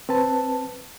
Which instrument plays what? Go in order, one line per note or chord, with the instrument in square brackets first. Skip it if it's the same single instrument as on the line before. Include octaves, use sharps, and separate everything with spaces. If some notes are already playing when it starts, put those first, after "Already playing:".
[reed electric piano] C4 B4 A5